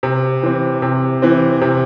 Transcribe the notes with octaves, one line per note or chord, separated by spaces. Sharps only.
C3
E3 C4
C3
E3 C4
C3